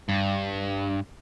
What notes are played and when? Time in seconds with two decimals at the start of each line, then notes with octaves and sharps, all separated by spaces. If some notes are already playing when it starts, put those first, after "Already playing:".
0.09 G2